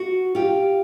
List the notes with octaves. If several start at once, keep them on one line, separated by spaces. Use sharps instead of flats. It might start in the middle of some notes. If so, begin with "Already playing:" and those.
Already playing: F#4
F4 G4